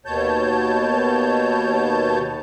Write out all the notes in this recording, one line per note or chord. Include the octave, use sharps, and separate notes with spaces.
D#2 B2 C#5 A5 G6